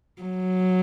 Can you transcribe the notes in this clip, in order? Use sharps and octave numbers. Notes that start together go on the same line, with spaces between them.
F#3